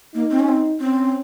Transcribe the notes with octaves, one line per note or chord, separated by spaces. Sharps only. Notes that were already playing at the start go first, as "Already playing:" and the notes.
A#3 D#4
C4
C#4
C4
C4 C#4